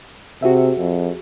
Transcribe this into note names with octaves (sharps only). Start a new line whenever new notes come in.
C3 F#4 G#4 E5
F2